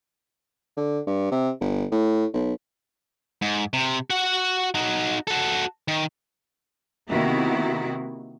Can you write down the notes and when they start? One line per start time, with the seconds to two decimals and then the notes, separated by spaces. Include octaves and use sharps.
0.77 D3
1.07 G2
1.31 C3
1.61 G1
1.91 A2
2.33 B1
3.42 G#2
3.73 C3
4.10 F#4 F#5
4.75 D#4 F#4
5.27 F#4 A4
5.88 D#3
7.10 C3 D#3 A#3 B3 E4 F#4